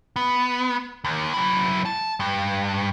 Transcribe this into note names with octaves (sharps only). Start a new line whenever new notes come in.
B3
D#2
F#3 E4
A5
G2